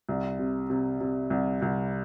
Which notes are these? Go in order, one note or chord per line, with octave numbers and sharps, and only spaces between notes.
C2
C3
C3
C3
C2
C2